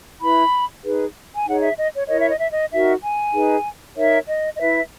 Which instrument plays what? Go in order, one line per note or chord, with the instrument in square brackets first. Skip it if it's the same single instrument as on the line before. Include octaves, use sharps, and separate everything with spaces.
[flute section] E4 B4 B5
D#4 G#4 B4
G#5
D#4 G#4 C#5 F#5
E5
D#5
C#5
E4 A#4 C#5 D#5
E5
D#5
E5
D#5
D#4 F#4 A#4 E5
G#5
D#4 G#4 B4
D#4 A#4 C#5 E5
D#5
D#5
E4 B4 E5